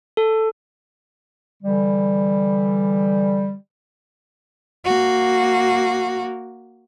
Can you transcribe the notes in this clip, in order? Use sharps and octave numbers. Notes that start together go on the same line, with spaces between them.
A4
D3 E3 G3
A#3 F#4